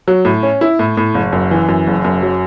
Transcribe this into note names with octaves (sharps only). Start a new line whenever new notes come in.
F#3
A2
C#4
E4
A2
A2
F#1
F#2
E3
F#2
F#1
F#2
F#3